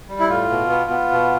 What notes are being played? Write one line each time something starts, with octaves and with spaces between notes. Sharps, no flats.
G3
E4
A2 F4
B2
B3
B3
B2